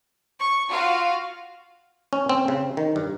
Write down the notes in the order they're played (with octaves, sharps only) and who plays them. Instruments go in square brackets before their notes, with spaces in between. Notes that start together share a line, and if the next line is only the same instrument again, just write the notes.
[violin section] C#6
F4 F#4 F5
[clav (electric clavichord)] C#4
C4
C#3
D#3
G2